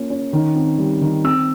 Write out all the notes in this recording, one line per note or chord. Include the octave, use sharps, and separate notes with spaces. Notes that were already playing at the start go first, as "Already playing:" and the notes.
Already playing: A#3 C#4 F4
C#4
D#3
C4
G3
D#3
C4 E6